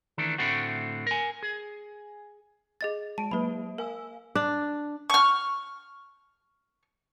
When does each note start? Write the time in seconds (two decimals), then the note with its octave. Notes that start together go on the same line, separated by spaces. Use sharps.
0.18 D#3 E3 A3 D4
0.38 A2 D3 A3 C4 F#4
1.07 A#4 G#5
1.43 G#4
2.81 G#4 D#5 A6
3.18 G#3 A5 D7
3.31 F#3 A#3 B4 B5
3.78 A#4 F5 G#5 E6
4.35 D4
5.10 C#6 F6